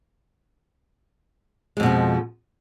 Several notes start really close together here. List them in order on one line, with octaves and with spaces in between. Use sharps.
G#3 F2 B2 F3